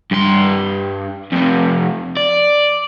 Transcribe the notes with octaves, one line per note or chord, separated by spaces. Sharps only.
G2 C6
F2 C3
D5